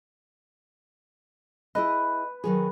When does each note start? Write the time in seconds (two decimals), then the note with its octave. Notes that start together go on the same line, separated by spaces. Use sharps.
1.75 E4 G#4 B4 D#5
2.44 D#3 F#3 G#4